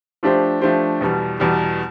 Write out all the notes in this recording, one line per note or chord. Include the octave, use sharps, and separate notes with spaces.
F3 A3 D4 G4 C5
F3 A3 D4 G4 C5
E2 B2 G3
E2 B2 G3